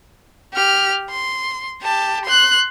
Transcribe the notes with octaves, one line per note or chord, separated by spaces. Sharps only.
G4 F6
C6
G4 A5
C6 F#6